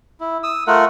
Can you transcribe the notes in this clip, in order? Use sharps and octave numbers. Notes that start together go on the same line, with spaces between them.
E4
D#6 E6
A3 F4 A#4 F#5